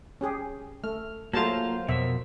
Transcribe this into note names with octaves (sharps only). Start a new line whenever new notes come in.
C#4 G4 G#4
A3 F6
F#3 A3 A#3 F4 G#4 A#4 C5 A5
F2 B2 E5